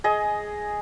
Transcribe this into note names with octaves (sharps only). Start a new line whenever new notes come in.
G#4 D#5